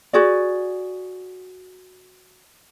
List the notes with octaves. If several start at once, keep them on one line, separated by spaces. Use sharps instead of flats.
F#4 G#4 D5